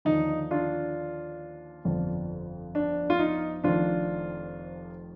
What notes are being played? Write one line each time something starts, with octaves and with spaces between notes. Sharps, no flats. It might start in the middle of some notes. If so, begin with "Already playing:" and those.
D#2 D3 F3 D#4
D4 F4
G1 F2 D3 F3
D4
F4
D#4
F1 F2 D#3 D4 F4